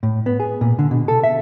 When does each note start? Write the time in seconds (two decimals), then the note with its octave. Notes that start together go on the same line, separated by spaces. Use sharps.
0.03 A2
0.26 B3
0.40 G#4
0.61 A#2
0.79 D3
0.91 B2
1.08 A4
1.23 E5